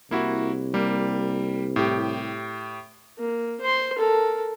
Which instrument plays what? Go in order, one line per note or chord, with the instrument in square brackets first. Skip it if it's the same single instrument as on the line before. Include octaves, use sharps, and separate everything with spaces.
[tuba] C2 [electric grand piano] A#3 E4 F#4
[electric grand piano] G3 A#3
A2 G4
[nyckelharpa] A#3
C5 C6
A4 A#4